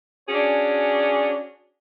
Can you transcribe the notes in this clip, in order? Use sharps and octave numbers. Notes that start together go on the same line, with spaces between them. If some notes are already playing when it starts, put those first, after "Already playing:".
C#4 D4 F#4 G#4 C#5